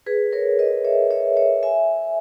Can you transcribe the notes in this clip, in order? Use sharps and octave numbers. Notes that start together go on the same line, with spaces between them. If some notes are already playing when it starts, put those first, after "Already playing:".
G#4 B4
A#4 C#5
B4 D#5
C#5 E5
C#5 E5
C#5 E5
E5 G#5